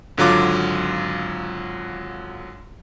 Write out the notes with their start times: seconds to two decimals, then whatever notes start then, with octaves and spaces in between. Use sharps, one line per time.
0.18 G#1 D3 F#3 F4 D6